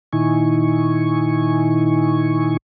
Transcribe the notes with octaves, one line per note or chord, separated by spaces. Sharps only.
A#2 D#3 D#4 E4 G#5 C#6